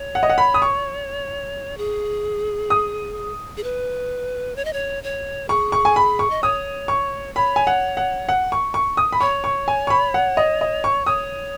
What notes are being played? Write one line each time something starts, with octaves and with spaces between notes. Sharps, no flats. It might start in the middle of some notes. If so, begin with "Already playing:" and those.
Already playing: C#5
F#5
D#5
F#5
B5
D#6
C#6
G#4
D#6
G#4
B4
C#5
D#5
C#5
C#5
G#4 C#6
C#6
G#5
B5
C#6
D#5
C#5 D#6
C#6
C#5 B5
G#5
F#5
F#5
F#5
C#6
C#6
D#6
B5
C#5 C#6
C#6
G#5
C#6
B5
F#5
D#5
D#5
C#6
C#5 D#6